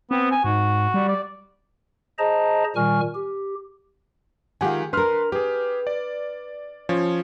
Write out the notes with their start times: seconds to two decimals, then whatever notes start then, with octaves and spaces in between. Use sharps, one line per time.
0.11 B3 C4
0.31 G#5
0.44 G#2 F#4
0.94 G3
1.08 D5
2.19 G#4 C5 D#5 A5 A#5
2.76 A#2 D#3 G3 G#5 C#6 F6
3.15 G4
4.61 D#3 G#3 F4 G4 F#5 G#5
4.93 D4 A#4 B4 C6 F6
5.32 G4 G#4 B4
5.87 D5
6.89 F3 C#4 C#5